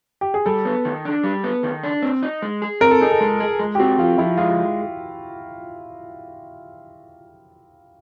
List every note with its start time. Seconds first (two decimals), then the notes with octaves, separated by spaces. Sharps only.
0.21 G4
0.34 G#4
0.46 G3 A4
0.65 B3
0.85 D#3
1.05 D4
1.24 G3
1.44 B3
1.63 D#3
1.83 D4
2.02 C4
2.23 D#4
2.42 G#3
2.62 G#4
2.81 C4 A#4
2.91 A4
3.01 D#4 G#4
3.11 A4
3.20 G#3
3.40 G#4
3.59 G#3
3.75 G4
3.79 C4 F#4
3.98 F3 F4
4.18 F3 E4
4.37 G#3 F4